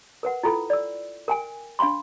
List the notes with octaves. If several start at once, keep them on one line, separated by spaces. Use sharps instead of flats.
A#4 B4 F#5
E4 F4 A4 G5 B5
D5 E6
A#4 G5 G#5
D4 F5 G5 B5 C6